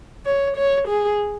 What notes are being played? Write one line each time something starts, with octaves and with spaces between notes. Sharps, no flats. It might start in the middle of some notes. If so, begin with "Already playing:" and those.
C#5
C#5
G#4